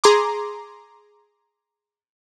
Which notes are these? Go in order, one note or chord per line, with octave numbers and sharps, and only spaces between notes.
G#4 A#5 C6 D6